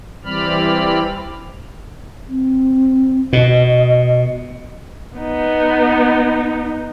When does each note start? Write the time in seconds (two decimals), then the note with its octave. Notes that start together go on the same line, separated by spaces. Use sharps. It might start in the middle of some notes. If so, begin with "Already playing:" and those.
0.24 E3 G3 C4 D5 B5 F6
2.27 C4
3.33 B2 D#5
5.17 B3 D#4